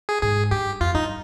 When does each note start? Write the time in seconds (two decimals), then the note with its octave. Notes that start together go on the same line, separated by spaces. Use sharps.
0.09 G#4
0.22 G#2 G#4
0.51 G2 G4
0.81 F2 F4
0.95 G2 D#4